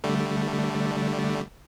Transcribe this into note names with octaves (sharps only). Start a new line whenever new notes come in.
D3 G3 A3